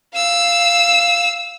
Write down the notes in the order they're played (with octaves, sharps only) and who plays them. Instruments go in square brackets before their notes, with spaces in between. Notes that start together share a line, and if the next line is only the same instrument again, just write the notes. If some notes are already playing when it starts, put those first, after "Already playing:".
[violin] F5 E6